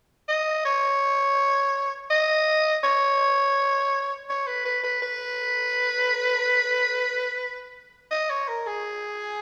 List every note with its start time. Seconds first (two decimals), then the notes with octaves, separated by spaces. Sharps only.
0.29 D#5
0.65 C#5
2.10 D#5
2.84 C#5
4.29 C#5
4.47 B4
4.65 B4
4.83 B4
5.02 B4
8.11 D#5
8.30 C#5
8.48 A#4
8.66 G#4